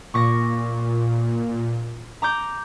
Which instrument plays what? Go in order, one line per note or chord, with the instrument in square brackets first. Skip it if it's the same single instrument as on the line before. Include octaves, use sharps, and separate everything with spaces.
[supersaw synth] A#2 [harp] C#6 D6 A#6
[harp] A#5 D6 G6